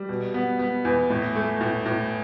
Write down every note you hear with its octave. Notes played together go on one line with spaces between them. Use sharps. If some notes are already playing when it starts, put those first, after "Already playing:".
Already playing: G3
B2
B3
B3
E2
A2
A3
A2
A2